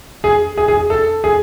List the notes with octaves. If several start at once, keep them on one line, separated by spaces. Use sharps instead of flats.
G#4
G#4
G#4
A4
G#4